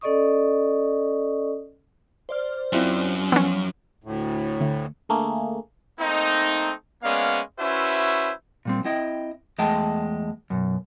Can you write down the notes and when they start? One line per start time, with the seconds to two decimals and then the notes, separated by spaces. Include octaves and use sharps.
0.01 C#4 A4 D5 D#5 C#6 D#6
2.29 C5 D5 F6
2.73 F#2 C4 E4 F4
3.32 F3 B3 C#4
4.04 D2 A2
4.61 D3 A3 C#7
5.09 D3 A3 A#3 G#4
5.99 A3 A#3 C4 D#4
7.03 G#3 A#3 B3 C#4 D5 F5
7.59 C#4 E4 F#4 B4 C5 E5
8.65 A#2 G3 C4
8.85 C4 E4 D#5 G5
9.58 E2 G#3 A3 D#5 G5 A5
10.50 F#2 B2